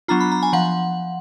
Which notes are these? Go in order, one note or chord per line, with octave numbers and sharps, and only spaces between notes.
F#3 B3 D4 F4 A#5
B5
A#5
G#5
F3 F#5